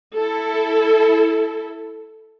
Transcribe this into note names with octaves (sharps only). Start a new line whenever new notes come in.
E4 A4